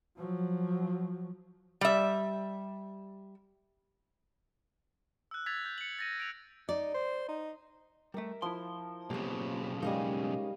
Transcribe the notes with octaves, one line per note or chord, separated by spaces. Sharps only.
F3 F#3
G3 E5
E6 F#6
E6 G#6 A6 B6 F7
G6
C#7 F#7
A6 A#6 D#7
D7 F7
D#4 D5
C5
D#4
G3 A3 A#4 E5
F3 E4 C6
B1 C#3 A#3 C4 G4
G3 G#3 C#4 D#4 G#4 A#4 D#5 F5